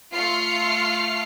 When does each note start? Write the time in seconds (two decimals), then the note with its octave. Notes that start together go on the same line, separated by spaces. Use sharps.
0.13 A3 F4 F6 C7 C#7